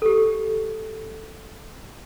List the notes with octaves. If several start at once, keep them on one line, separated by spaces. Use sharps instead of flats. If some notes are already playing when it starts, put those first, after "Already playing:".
G4 A4